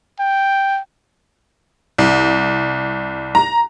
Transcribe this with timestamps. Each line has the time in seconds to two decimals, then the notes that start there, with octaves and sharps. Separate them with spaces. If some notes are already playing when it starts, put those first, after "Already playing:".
0.19 G5
1.98 C2
3.35 A#5